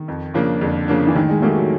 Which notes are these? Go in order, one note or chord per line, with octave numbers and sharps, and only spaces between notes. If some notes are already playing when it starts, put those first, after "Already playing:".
Already playing: D#3
F2
C#3 F3 A#3 D4
F2 D3
C#3 F3 A#3 D4
E3
A2 D#3
G#3
F#3 A3 A#3 D#4 G4
F#3